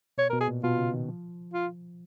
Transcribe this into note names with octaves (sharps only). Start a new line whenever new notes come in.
B2 C#5
B2 A#4
G#4
A#2
B2 F4
C#3
D#3
F3
F4